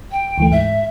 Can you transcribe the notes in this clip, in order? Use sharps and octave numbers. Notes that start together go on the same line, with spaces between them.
G5
D2 E3 A3
G#2 E5